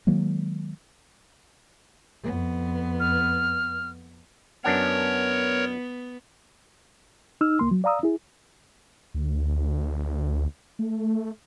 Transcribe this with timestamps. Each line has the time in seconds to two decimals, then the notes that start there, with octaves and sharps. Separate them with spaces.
0.07 D#3 F#3 G#3 A#3
2.23 F2 B3
3.00 F6
4.64 F#2 B3 D4 A#4 C#5 F#5
7.41 D#4 E6 F6
7.59 C#2 A#3 C6
7.71 F#3
7.84 D5 F5 A#5 D#6 E6
8.03 E4 G#4
9.14 D2
10.79 A3